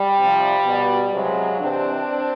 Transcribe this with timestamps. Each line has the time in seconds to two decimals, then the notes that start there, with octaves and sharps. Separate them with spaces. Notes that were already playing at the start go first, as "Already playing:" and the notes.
Already playing: G3
0.18 C3 F3
0.65 B2
1.12 C3 F3 F#3 G#3
1.60 C3 E3 C4 D4